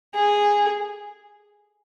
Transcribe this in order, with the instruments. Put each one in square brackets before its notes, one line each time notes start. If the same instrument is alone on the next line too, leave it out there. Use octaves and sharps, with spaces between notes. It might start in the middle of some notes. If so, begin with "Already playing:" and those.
[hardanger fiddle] G#4